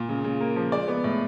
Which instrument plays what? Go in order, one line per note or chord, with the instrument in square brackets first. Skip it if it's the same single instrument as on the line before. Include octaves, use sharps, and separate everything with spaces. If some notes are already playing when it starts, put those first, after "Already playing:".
Already playing: [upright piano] A#2
C#3
C#3
A#3
F3
G#3 D5
B3
A2